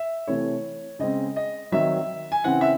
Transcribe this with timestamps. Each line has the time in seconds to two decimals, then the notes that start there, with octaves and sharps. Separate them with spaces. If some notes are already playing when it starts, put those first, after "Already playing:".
Already playing: E5
0.27 C3 E3 A3 C4 C#5
0.99 C#3 G#3 C4 D#5
1.36 D#5
1.72 D#3 F#3 C4 E5
2.32 G#5
2.44 C#3 E3 C4 F#5
2.61 E5